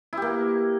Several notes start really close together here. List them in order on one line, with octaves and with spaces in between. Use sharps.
E4 G4 A#3